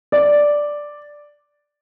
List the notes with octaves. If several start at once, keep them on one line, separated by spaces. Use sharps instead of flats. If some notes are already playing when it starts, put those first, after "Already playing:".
D5